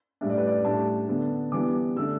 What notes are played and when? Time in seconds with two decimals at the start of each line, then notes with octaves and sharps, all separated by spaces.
0.21 A2 G3 D4 E5
0.30 D5
0.38 B4
0.47 D5
0.65 A2 G3 D4 A5
1.08 D3 B3 D4
1.52 E3 G3 B3 D4 D6
1.96 D3 A3 D4 E6